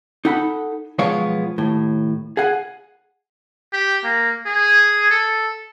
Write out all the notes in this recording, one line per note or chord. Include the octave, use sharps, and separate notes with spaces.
D#4 A4 F#5 B5
B1 F3 G#3 B3 C#5 F5
D#2 A2
G#4 F5 F#5 G#5
G4
A#3
G#4
A4